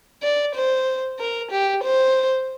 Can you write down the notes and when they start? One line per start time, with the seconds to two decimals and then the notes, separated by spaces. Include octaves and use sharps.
0.23 D5
0.55 C5
1.19 A#4
1.51 G4
1.83 C5